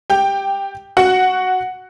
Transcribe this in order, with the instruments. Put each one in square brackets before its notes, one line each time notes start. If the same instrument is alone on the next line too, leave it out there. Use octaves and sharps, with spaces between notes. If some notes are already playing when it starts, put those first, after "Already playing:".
[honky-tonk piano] G4 G5
F#4 F#5